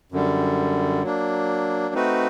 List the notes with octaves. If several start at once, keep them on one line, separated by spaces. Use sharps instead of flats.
F#2 D3 G3
F#3 A#3 D4
A3 C4 D#4 F#4 B4